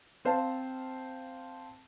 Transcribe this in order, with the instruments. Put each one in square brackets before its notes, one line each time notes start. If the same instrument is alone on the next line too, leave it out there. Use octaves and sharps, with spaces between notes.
[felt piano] C4 C5 F5 A5